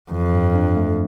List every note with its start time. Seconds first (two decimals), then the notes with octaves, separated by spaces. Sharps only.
0.11 F2 E3
0.33 G2
0.55 D4
0.77 A3